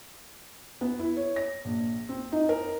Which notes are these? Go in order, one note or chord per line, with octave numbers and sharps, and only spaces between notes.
B3
E4
C#5
A#6
A#1
C4
D#4
A#4